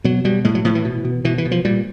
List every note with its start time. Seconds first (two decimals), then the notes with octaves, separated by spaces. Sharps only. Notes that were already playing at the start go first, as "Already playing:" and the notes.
0.04 B2 F#3
0.25 B2 G3
0.45 A2 G#3
0.55 F#3
0.65 A2 F3
0.75 E3
0.85 B2
1.05 B2
1.25 B2 E3
1.38 E3
1.45 B2
1.51 F3
1.65 A#2 G3